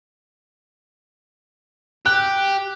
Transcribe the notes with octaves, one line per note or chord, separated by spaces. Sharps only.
G4 F#6